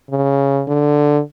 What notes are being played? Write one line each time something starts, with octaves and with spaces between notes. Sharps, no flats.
C#3
D3